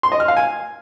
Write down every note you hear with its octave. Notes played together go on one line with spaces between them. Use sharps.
C6
D#5
F6
F5
G#5